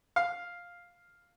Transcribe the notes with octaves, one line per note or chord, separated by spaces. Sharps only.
F5